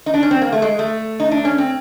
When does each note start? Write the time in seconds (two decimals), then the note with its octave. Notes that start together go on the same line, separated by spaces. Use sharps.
0.06 D#4
0.14 D4
0.23 C#4
0.31 C4
0.42 A#3
0.52 A3
0.62 G#3
0.79 A3
1.20 D#4
1.31 D4
1.45 C#4
1.58 C4